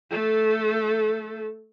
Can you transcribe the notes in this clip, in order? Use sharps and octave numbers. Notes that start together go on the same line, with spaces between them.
A3 A4